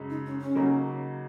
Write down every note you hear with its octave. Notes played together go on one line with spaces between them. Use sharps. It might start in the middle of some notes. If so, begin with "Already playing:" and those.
Already playing: F#2 C#3 G#3
D#4
C#4
C#4
C#3 F#3 A#3 D#4